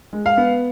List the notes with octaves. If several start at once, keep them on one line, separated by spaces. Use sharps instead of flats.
G#3
F5
B3